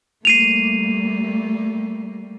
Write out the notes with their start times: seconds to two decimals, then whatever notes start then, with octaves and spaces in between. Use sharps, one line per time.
0.25 G3 A3 A#3 C7 D#7 F7